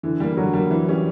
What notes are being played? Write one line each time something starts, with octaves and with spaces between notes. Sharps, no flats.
D3 E3
G3 A#3
D3 F#3
G3 A#3
E3
G3 C#4 G4